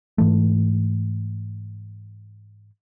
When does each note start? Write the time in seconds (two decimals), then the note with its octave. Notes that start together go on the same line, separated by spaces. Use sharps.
0.18 G#2 E3 A3